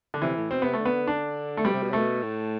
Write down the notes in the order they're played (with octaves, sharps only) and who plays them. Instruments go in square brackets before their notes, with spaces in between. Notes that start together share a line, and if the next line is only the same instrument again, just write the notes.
[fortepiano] D3
[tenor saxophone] C3 [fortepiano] E3
[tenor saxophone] A2
[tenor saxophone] B2 [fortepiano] C4
[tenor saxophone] C3 [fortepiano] B3
[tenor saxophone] D3 [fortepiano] A3
[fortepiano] B3
D4
A3
[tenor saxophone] B2 [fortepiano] G3
[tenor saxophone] C3
B2
[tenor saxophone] C3 [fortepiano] A3
[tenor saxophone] B2
A2